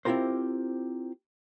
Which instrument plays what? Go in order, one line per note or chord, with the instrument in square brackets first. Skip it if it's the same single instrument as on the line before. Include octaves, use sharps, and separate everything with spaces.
[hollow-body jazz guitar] C4 E4 F4 G4 A#4 C5